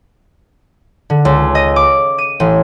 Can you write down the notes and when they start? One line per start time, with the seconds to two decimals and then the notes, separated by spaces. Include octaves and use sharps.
1.10 D3
1.25 C#2
1.55 D#5
1.76 D6
2.18 D#7
2.40 A1